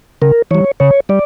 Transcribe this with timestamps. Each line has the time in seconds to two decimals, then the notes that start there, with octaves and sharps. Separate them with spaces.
0.22 C#3 A#4
0.51 E3 G3 C#5
0.80 C#3 C#5
1.09 G3 D5